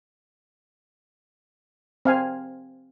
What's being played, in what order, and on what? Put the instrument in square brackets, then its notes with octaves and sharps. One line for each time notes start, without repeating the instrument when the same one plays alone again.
[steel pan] C4 F5 G#5